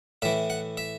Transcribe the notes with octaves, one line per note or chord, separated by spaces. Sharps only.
A2 E3 E5
F#5
E5